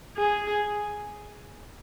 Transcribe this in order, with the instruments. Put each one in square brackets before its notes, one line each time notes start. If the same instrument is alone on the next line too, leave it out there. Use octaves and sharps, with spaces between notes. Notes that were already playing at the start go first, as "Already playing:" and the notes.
[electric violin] G#4